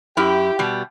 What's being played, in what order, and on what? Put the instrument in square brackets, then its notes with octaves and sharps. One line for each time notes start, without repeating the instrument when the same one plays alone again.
[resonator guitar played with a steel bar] F#2 E4 [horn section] G4
[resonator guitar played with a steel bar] B2 G3